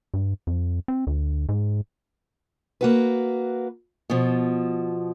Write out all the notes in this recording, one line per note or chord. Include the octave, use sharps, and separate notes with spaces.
G2
F2
C4
D2
G#2
A#3 F#4 B4
B2 F3